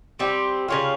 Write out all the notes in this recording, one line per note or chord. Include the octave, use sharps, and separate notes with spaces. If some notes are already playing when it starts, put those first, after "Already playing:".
G3 C4 G4
C#3 G3 C#4 F4